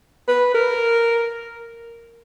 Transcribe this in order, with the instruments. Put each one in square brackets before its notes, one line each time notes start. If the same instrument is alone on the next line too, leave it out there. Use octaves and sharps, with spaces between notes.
[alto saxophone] B4
A#4